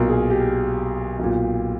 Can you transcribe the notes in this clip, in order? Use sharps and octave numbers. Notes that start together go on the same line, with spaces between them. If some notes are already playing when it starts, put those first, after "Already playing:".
Already playing: B1 A#2 A#4
G#4
G4
B1 A#2